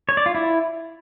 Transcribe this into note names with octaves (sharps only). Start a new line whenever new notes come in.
C#5
D5
F4
E4